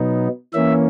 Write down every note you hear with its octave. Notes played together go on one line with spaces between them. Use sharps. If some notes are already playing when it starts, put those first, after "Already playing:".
Already playing: B2 F#3 B3 D#4
E3 A#3 C#4 E5